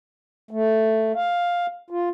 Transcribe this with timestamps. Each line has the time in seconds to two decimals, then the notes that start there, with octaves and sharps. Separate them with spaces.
0.51 A3
1.16 F5
1.90 F4